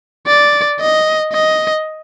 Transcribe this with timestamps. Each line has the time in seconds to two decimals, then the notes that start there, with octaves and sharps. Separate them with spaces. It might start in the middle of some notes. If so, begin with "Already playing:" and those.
0.27 D5
0.80 D#5
1.33 D#5